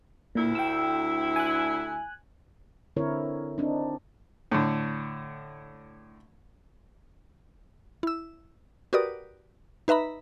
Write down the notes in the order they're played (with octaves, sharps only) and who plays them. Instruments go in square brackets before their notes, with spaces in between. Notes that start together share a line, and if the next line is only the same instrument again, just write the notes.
[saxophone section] D2 E4 [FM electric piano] A#2
[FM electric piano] G5 E6
G#5 F#6
[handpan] D3 C4 E4 A#4 C#5
C4 D4 D#4
[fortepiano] A2 D3
[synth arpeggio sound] E4 E6
F#4 G4 A#4 B4 D5 D#6
D#4 B4 E5 A#5 B5